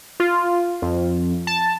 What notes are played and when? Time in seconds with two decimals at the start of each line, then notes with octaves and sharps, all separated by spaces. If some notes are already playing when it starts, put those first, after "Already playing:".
0.20 F4
0.82 F2
1.47 A5